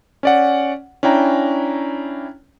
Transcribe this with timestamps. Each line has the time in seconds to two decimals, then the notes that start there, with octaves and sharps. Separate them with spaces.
0.23 C#4 D5 F#5
1.03 C#4 D4 E4 G5 A#5